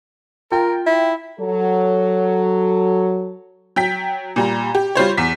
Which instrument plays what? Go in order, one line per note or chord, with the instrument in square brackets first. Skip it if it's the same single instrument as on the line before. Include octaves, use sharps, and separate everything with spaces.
[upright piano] F4 G5 [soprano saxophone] A#4
[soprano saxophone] E4
[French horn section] F#3 A4
[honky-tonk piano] F#3 G5 B6
A#2 G3 A#5
G4
G3 F4 C5 C#5
E2 B6